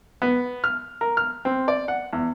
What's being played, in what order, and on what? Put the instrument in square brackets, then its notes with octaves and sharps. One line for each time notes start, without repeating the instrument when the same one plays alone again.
[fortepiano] B3
F6
A#4
F6
C4
D5
F#5
E2